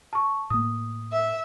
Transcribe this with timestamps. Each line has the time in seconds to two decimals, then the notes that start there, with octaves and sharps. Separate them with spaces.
0.13 A5 C#6
0.50 A2 A#3 D#6
1.11 E5